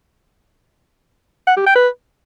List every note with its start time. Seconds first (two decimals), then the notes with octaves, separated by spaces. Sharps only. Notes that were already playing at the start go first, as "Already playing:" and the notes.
1.47 F#5
1.57 G4
1.66 G5
1.76 B4